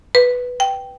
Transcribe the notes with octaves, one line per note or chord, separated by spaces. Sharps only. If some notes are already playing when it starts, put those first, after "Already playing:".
B4
G5